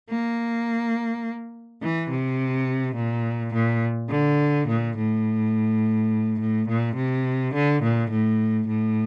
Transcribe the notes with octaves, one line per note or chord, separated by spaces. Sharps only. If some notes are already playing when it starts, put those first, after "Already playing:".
A#3
E3
C3
A#2
A#2
D3
A#2
A2
A2
A#2
C3
D3
A#2
A2
A2